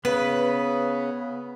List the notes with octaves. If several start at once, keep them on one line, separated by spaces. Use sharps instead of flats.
C#3 B3 B4